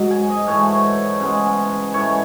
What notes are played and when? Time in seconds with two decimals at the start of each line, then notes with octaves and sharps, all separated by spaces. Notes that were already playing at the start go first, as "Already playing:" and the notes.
Already playing: G#2 F#3
0.11 G#5
0.30 D#5
0.47 G#2 E3 A3 C#5
1.20 C#3 G#3 B3
1.94 G#2 E3 A3 C#5